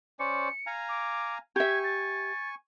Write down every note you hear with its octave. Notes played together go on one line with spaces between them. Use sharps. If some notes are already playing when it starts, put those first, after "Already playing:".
C#4 C5 D5 C#7
F5 G#5 A#5
D6
G4 E5 G#5 C#6 G#6
A6